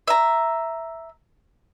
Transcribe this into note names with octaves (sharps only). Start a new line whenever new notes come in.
E5 A#5